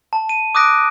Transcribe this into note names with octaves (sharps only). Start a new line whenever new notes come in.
A5
D#7
D6 D#6 F#6 A#6 D7